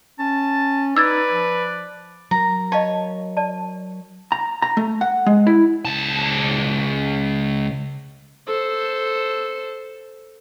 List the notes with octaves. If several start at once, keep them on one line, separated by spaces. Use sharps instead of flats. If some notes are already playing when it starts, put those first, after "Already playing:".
C#4 A5
D#4 B4 D5 E6 G#6 A6
F3
F#3 A#4 A#5
C#5 D#5 F5 A5
D5 A5
A#5
A#5
A3
F#5
G#3
E4
C#2 A5
A4 C5